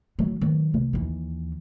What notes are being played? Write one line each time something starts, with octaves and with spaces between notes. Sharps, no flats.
D#3 F#3
D#3 F#3
C3
D#2 E3